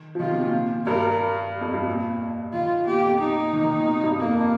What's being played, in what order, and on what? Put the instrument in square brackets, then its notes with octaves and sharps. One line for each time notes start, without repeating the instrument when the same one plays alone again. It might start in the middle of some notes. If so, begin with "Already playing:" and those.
Already playing: [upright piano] D#3
F3
[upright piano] D#3 [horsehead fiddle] F4
[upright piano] C3
A#2
[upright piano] G2 [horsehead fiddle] A#4
[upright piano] F2
G2
A#2
[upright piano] D#3 [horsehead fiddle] F4
[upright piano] A#2 [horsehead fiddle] G4
[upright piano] F2
[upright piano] A#2 [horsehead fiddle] D#4
[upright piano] D#3
D#3
A#2
C3
G2
[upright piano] F2 [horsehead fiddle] A#3